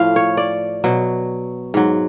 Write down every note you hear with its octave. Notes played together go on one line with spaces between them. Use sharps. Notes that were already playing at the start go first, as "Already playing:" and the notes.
Already playing: A2 F3 F5
C#5
D5
B2 F#3
G#2 F#3